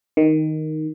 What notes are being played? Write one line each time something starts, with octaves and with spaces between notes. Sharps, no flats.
D#3